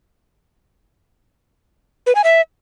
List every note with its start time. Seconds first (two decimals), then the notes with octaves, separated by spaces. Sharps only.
2.07 B4
2.15 G#5
2.24 E5